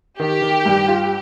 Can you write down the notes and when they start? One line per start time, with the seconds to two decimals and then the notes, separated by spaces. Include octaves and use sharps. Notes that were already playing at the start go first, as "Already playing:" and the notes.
0.20 D#3 G4
0.42 D#3
0.66 G2
0.88 F4